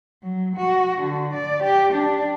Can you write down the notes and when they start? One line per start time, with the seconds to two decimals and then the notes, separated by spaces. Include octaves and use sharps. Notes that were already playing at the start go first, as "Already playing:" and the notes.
0.23 F#3
0.56 F#4
1.01 D3
1.33 D5
1.63 G4
1.93 D4